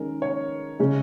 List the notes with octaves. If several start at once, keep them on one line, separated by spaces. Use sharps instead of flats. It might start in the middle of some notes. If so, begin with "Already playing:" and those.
Already playing: D#3 G#3 C#4 A#4
C#5
C#3 G#3 C#4